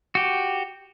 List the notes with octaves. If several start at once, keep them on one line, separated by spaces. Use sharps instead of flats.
F#4 G4